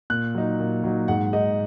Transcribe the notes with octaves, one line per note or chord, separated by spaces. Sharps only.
A#2 F#6
F#3 D#4
A#2
F#3 D#4
G#2 F#5
G#3 D#4 D#5